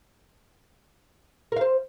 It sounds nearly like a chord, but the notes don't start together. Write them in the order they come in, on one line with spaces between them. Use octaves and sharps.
A#4 F5 C5